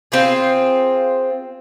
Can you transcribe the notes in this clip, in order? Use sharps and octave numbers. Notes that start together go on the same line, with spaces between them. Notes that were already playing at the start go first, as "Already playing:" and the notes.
C4 F4 G#4